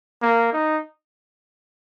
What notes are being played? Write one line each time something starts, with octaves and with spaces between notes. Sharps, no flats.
A#3
D#4